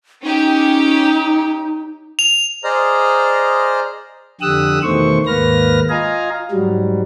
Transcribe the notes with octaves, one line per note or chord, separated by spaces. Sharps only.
C#4 D#4 G4
F7
G#4 C5 D5 D#5 A#5 F6
F2 D3 G4 D#6 E6 F#6
E2 B2 D#3 A3 C5 C#6
D#2 G#2 A#3 B4 F6 A#6
F4 D#5 F5 G#5 A#5
G#2 F#3 G3